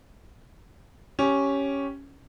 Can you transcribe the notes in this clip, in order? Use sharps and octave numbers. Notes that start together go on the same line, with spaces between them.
C#4 G4